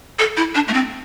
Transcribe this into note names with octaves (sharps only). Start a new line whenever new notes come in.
A4
E4
D4
A3
C4